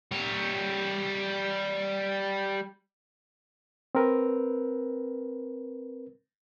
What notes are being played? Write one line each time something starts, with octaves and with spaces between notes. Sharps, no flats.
G3 C#5
C4 A#4 B4